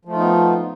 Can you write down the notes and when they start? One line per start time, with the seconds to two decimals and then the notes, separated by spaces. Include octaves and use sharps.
0.05 F3
0.09 A3
0.12 F4
0.16 D#4
0.19 B3